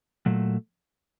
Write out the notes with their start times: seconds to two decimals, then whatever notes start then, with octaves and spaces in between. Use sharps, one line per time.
0.26 A#2 F#3 A3